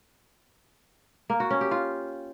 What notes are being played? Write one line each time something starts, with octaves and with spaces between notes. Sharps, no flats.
A#3
F#4
C#4
G4
F4